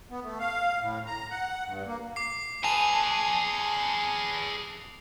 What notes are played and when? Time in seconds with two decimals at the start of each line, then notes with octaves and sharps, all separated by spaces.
0.11 B3
0.24 A3
0.39 F5
0.81 A2
1.06 A#5
1.31 F#5
1.67 G2
1.86 A#3
2.16 D6 C7
2.64 G#4 B4 G#5 A5 F7